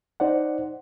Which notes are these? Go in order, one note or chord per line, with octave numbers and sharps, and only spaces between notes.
D#4 C5 D5 F#5